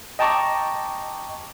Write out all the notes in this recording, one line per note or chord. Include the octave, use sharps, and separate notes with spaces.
D#5 G5 A5 A#5 C#6 D6